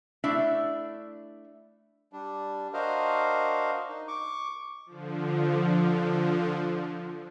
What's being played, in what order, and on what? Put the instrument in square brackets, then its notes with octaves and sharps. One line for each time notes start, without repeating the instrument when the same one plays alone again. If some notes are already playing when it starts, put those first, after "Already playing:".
[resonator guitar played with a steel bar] A3 D4 E4 D5 E5
[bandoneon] G3 D4
D4 F#4 A#4 C5 D#5 F5
D#4
C#6 D6
[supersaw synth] D3 F3